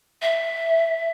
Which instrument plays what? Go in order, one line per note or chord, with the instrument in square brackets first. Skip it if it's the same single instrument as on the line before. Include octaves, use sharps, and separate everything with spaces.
[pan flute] E5